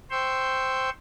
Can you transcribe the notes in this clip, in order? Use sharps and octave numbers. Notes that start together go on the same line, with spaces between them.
C5 G5 C6 C#6 E6 G6